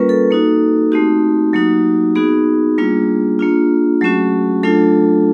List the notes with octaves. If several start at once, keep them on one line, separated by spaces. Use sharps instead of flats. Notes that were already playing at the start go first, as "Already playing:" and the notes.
Already playing: G3 A#3 C#4 F4 A#4 B4
A4
A#3 D#4 F#4
A3 C4 D#4 F#4 G4
F#3 A#3 D#4 F#4
B3 D#4 F#4 G#4
G3 A#3 D4 F4
A#3 D4 F4
F#3 A3 C#4 F#4
F#3 A3 D4 F4 A4